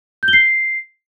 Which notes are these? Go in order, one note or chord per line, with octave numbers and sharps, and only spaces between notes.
G6
G7
C7